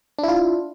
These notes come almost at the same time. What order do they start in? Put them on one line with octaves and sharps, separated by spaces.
D4 E4 F4